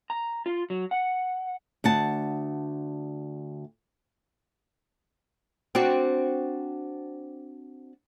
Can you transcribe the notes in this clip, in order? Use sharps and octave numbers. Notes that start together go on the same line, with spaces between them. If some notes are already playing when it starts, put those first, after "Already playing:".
A#5
F4
F#3
F#5
D2 F#5 A5
C4 D4 F#4